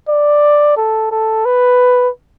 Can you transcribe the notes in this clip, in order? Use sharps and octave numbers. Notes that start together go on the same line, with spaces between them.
D5
A4
A4
B4